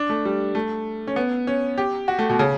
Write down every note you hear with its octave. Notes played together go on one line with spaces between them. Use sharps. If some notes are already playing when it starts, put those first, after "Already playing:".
Already playing: D4
A3
G3
A3
C#4
B3
C#4
G4
F#4
A3
B2
C#3